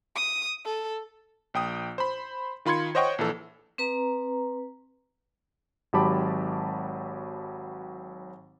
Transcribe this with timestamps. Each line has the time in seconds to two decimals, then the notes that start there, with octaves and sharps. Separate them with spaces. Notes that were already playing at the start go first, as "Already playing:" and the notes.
0.15 D#6
0.65 A4
1.54 A#1 G5 D#6
1.98 C5 B5
2.65 D#3 F4 B5 C6 G#6 C#7
2.95 C5 C#5 D#5 F#5 G5 C#6
3.18 A#1 E3 A4
3.78 C4 B4 A#5
5.93 G#1 F#3 G4 A5 B5 D6